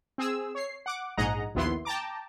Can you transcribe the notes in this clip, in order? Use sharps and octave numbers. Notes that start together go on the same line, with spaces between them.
C4 G#4 E6
C#5 C7
F#5 D6
A#1 G#2 G#4 D#5 F#5 A#5
A#1 D#2 B3 E4 C6
G5 A5 A#5 D6